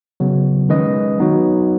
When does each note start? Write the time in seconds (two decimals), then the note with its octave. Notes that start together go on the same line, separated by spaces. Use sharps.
0.20 C#3 F#3 B3
0.69 D#3 G#3 C#4 B4 D#5
1.18 F#3 B3 D#4 F#4 C#5